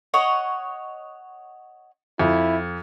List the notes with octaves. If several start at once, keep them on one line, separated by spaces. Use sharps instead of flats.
C#5 D#5 F#5
F2 E4